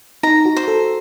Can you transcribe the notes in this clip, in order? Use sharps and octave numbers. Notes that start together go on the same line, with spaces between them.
D#4 A#5
F#4
C5
A4